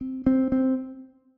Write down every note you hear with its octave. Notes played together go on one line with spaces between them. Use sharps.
C4
C4
C4